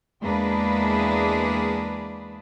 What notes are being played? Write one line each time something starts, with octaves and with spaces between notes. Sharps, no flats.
E2 G#3 A#3 D4 G#4 B4